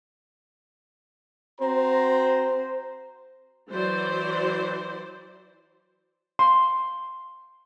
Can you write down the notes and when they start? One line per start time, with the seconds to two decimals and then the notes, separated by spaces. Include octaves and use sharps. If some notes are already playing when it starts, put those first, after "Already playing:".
1.61 C4 F#4 C5 A#5
3.69 E3 F#3 C5 D5
6.39 C6